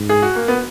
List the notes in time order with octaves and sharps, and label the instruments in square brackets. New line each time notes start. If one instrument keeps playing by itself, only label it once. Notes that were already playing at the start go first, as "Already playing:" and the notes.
Already playing: [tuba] G#2
[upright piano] G#4
F#4
A#3
B3